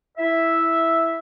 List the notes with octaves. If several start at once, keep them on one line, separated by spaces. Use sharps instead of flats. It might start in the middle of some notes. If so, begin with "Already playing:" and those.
E4 E5